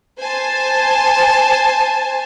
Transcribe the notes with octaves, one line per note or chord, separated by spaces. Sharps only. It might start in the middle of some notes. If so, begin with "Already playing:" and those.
C5 G#5 A5